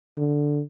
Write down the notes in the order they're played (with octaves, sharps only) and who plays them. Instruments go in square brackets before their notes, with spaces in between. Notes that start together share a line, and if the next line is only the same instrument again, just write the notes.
[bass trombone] D3